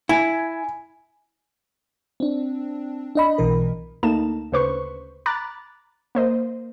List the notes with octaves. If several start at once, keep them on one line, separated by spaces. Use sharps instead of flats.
E4 G#5
C4 D4
D4 D#5 B5
B1 B2 E3 A#4
D2 A3 A#3 D#4 A5 E7
D2 C#3 B4 C5 C#6
A#5 B5 D6 F#6 A6
A#3 C5 D#5